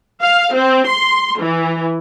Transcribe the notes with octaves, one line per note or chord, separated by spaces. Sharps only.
F5
C4
C6
E3